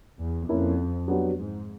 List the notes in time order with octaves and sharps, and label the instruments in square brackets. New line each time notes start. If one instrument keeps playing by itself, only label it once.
[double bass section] E2
[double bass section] F2 [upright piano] A#3 C#4 E4
[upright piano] F#3 B3 D4 G4 B4
[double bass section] G#2